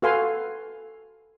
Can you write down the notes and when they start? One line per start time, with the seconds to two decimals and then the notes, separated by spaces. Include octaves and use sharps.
0.02 F#4 A4 B4 F5 G#5 C6